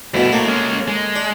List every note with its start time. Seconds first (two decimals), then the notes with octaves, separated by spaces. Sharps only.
0.14 D2 G2 B2 E4
0.32 A2 A3 A#3
0.47 G#3 C#4
0.88 G#3
1.15 D4